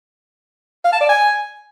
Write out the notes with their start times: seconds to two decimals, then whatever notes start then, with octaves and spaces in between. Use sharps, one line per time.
0.85 F5
0.93 A5
1.01 D5
1.09 G#5